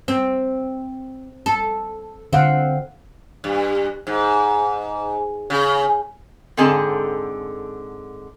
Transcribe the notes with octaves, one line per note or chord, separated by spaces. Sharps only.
C4
A4
D3 C4 F5 F#5
G2
G#2
C#3
G#2 D3 C4 G#4 A4 A5